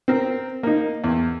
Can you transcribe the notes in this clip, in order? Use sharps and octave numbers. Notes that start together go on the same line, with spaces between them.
C4 A#4
A#3 D#4
E2